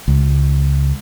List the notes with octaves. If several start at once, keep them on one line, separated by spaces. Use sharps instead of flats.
C#2